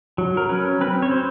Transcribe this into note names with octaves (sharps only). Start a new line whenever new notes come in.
F#3
A#4
C#4 B4
C4 B4
C#5
C4 C5